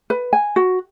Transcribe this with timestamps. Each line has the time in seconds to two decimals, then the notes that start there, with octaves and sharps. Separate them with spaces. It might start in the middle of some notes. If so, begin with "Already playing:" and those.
0.10 B4
0.33 G#5
0.56 F#4